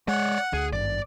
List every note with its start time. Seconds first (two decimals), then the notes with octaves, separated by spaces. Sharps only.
0.08 G#3 C#5 D5 F#5
0.53 D2 G#4
0.73 G#1 G2 D5